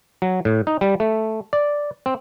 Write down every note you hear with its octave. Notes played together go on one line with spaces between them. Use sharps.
F#3
A2
D#4
G3
A3
D5
C4